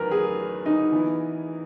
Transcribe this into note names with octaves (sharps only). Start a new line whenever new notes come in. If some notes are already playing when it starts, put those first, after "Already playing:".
Already playing: E2 D#3 F#3 A#4 B4
G#4
D#4
E3 B3 E4